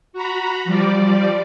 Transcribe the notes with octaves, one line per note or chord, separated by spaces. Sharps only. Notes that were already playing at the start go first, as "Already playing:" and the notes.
F#4 A#5 B5
F3 G3 D5